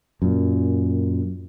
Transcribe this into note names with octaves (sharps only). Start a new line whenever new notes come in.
F#2 A#2